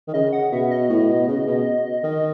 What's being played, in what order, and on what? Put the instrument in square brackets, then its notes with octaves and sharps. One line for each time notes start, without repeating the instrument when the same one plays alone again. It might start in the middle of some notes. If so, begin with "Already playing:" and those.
[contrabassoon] D#3
[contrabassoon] C#3 [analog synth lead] D#5
[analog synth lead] F#5
[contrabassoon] B2 [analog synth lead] E5
[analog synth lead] D#5
[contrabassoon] A2
B2
C#3
B2
D#3